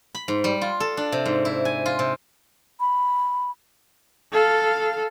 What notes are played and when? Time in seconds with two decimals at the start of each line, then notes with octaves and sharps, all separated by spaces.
0.15 B5
0.28 G#2
0.44 G3
0.61 F4
0.80 A4
0.97 D4
1.12 C3
1.26 G#2
1.45 E4
1.65 G#5
1.86 F4
1.99 C3
2.80 B5
4.32 A4 F5